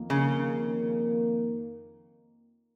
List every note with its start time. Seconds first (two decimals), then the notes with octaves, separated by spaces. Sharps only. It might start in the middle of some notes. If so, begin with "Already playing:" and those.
Already playing: F2 D#3 A#3
0.10 C#3